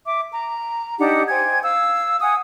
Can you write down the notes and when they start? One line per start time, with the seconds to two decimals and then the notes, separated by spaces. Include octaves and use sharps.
0.05 E5 D6
0.31 A#5
0.98 D4 D#4 G4 F#5
1.29 C5 G5 G#5 G#6
1.62 F5 E6
2.21 F#5 G#5 D#6